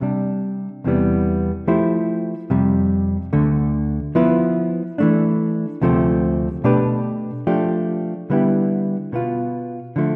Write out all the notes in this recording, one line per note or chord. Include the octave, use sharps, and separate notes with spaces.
C3 G3 D4
E2 C3 E3 G3 B3
F3 A3 E4 G4 C5
F2 C3 G3
D2 D3 A3
F3 B3 E4 B4
E3 A3 D4
D2 C3 F3 A3 C4
B2 A3 D4 G4 B4
F3 A3 D4 G4
D3 G3 B3 E4 G4
B2 B3 F4
D3 F3 A3